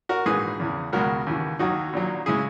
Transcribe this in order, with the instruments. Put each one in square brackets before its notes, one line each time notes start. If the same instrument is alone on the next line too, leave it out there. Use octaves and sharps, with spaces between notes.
[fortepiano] F#4 A#4
A#1 G#2 E3 G#3 G#4 B4
E2 C#3 E3
C#2 B2 G#3 F#4 A#4
D#2 C#3 E3
D#2 D#3 F#3 D#4 F#4
A#1 A#2 F#3
C#3 G#3 E4 G#4